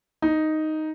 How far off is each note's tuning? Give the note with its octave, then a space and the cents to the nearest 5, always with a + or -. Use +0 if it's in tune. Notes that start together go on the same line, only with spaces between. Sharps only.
D#4 +0